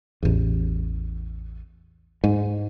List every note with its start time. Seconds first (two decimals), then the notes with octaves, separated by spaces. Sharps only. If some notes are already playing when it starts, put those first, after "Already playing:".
0.23 A1 E2
2.24 G#2